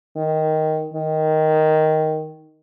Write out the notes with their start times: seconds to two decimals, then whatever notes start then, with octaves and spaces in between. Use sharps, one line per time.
0.16 D#3
0.94 D#3